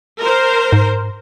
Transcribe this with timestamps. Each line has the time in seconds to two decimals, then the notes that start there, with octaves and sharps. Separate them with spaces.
0.20 A#4 C5
0.73 G#2